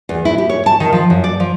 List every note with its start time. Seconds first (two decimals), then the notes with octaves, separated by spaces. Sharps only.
0.09 E2
0.25 E4
0.38 G4
0.49 C#5
0.66 A5
0.80 D#3
0.93 F3
1.10 F#2
1.24 D5
1.40 F3